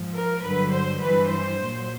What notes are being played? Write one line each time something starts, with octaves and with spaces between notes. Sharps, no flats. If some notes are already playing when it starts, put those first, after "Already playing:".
Already playing: G#2 F3
A#4
G2 D3 F#3 B4
C5
G2 E3 B4
C5
A#2 F#3